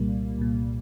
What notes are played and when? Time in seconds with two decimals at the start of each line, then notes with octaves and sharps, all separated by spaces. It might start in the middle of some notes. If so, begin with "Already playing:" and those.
Already playing: C2 A#2 G3 A#3
0.38 C2 A#2